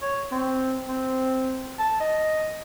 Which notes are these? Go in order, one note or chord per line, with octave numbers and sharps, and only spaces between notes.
C#5
C4
C4
A5
D#5